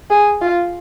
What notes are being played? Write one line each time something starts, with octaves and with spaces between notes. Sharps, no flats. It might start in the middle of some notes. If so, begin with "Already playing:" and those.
G#4
F4